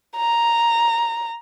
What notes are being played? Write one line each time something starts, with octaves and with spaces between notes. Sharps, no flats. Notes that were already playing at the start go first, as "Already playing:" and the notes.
A#5